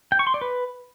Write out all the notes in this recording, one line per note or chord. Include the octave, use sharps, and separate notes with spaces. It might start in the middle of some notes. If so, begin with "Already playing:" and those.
G5
C#6
C6
D5
B4